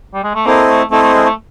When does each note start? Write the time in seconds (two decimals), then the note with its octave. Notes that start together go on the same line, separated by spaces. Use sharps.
0.14 G3
0.24 G#3
0.35 A3
0.46 A#3 C4 E4 A4 C5 D#5
0.68 A3
0.91 A3 C4 E4 A4 C5 D#5
1.02 A3
1.14 G#3
1.25 A3